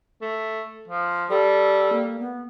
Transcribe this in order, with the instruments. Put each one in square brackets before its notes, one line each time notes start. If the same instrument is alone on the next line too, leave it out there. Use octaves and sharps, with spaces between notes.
[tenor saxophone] A3
F3
[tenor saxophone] G3 [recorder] A4
[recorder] A#3
B3